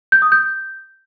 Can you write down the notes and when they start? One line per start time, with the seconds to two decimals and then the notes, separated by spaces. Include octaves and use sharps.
0.12 G6
0.22 D#6
0.32 G6